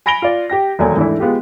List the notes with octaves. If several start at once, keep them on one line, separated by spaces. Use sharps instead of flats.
G#5 B5 A#6 D7 F7 G7
F4 D5 F5
G4 G5 A#6
E1 D#2 F#3 A3 D5 G#5
G#2 E3 A3 D4 E4
G#3 B3 F4 G4